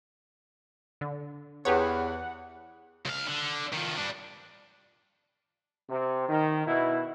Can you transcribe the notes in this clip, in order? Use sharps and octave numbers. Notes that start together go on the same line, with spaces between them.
D3
E2 G4 B4 C#5 F#5
C#2 F5
D3
D#3 F3
G3 D4
C3
D#3
B2 E4